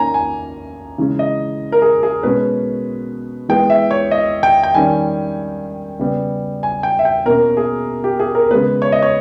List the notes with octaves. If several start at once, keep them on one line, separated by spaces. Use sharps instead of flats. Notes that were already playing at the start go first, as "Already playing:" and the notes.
Already playing: D#3 A#3 C#4 G#5 A#5
G#5
C#3 E3 G#3 C#4
D#5
A#4
G#4
G#4
B2 G#3 C#4 B4
E3 G#3 B3 G5
E5
C#5
D#5
G5
G5
D#3 G3 C#4 G#5
C#3 G3 B3
G#5
G5
E5
G5
B2 A#3 C#4 A#4
G#4
G4
G#4
A#4
C#3 G#3 B3 B4
C#5
D#5
C#5